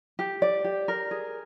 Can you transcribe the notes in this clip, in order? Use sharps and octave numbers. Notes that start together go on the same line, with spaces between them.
G4
D5
G4
A#4
G#4